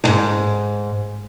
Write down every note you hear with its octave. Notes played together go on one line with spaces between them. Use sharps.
D2 G#2